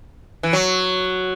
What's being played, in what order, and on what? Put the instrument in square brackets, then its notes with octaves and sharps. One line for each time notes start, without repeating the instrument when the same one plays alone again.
[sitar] E3
F#3